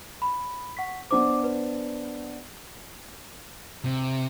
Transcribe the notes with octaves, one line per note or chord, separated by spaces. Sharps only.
B5
F#5 C#6 B6
B3 D4 C5 D6
B4
C3